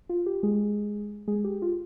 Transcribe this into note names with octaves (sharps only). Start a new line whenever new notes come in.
F4
G4
G#3 G#4
G#3 G#4
G4
F4